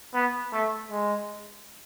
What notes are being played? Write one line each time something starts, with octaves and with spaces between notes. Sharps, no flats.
B3
A3
G#3